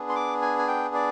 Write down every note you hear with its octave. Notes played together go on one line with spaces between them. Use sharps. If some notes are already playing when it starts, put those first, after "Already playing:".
Already playing: B3 D4 G#4
C6
D6
G#5
G#5
G5
D5